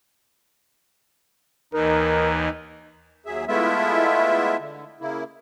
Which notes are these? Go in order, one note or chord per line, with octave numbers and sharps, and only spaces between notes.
D#2 E3 D#4 A#4
D#2 F#3 G#4 E5
G#3 A3 B3 E4 F4 E5
D3
C#3 A#3 E4